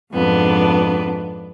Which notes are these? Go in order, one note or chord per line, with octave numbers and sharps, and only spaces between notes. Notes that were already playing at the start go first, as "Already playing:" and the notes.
F2 G#2 B3 D4